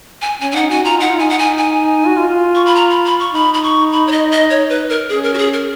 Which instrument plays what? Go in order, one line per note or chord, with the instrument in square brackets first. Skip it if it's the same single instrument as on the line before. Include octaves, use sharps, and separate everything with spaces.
[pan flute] G#5
[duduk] C#4 [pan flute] G#5
[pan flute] G#5
[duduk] D#4 [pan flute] F#5
[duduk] F#4 [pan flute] G#5
[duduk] F4 [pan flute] A#5
[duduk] D#4 [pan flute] F#5
[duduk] F4
[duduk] D#4 [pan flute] G#5
[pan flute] F#5
G#5
G#5
[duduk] F#4
F4
[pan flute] C#6
B5
A#5
B5
B5
C#6
[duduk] D#4 [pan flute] B5
[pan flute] B5
C#6
B5
C#5
D#5
D#5
C#5
B4
A#4
[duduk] C#4 [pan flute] G#4
[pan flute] A#4
F#4
G#4
A#4